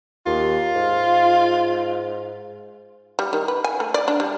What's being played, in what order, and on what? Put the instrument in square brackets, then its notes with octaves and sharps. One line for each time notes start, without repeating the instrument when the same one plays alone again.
[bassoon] D#2 [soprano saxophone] F4
[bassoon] G#2
[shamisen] G3
D#3
B4
G#5
A3
D5
D4
G3